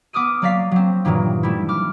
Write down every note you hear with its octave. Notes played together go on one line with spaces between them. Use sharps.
B3 D6 D#6 F6 D#7
F#3 A#3 D5 F5 B6 C7
F#3 C4
G2 A#2 D#3 E3 F#3
G3 A3 E4
D6 F6